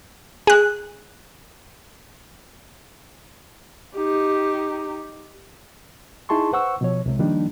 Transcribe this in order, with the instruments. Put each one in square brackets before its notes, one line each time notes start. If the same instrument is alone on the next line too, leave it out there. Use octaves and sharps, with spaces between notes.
[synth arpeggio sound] G#4 F#6
[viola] D#4 G4
[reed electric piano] D#4 E4 G#4 A5 C6 C#6
B4 C5 F#5 C#6 E6
B2 F3 C#5
C2 C3 G#3
D#3 F3 G3 A#3 D4 D#4